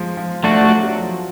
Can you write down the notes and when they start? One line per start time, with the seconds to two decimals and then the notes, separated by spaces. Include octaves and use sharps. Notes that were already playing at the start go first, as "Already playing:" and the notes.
Already playing: F3 G#3
0.17 F3
0.43 F3 A3 D4 F#4
0.63 F#3
0.83 F#3
1.02 F3